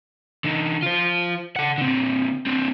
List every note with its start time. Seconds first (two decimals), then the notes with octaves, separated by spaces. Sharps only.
0.44 D3 D#4
0.82 F4 C5
1.56 A4 F#5
1.78 D3 C4
2.47 C4 D4